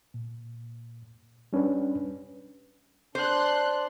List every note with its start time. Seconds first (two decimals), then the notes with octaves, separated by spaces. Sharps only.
0.14 A#2
1.53 G3 C#4 D4 B4
3.15 D4 C5 C6 F#6